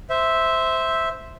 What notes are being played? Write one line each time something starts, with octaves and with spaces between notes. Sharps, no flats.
C5 E5